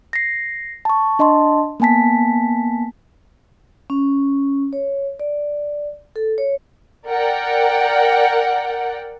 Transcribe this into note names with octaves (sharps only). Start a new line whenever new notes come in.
A#6 C7
A5 C#6
D4 D#5 A5 C6
A#3 B3 G#5 A5 B6
C#4
C#5
D5
A4
C#5
A#4 D5 F#5 G5